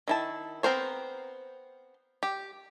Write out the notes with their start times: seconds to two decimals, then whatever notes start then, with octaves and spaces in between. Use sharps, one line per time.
0.08 D#3 E4 A5
0.63 B3 C4 A#4 C5 C#5
2.23 G4